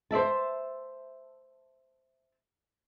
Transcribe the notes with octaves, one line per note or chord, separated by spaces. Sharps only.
C5 D5 E5 A5